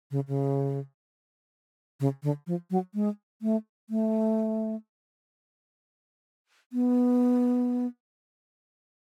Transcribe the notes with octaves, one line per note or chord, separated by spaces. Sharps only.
C#3
C#3
C#3
D3
F3
F#3
G#3
A3
A3
B3